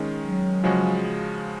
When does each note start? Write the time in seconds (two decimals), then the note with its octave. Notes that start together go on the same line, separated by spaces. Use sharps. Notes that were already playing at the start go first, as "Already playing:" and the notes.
Already playing: D#3 G#3 C#4
0.22 F#3
0.64 C#3 F3 G#3 C#4 F#4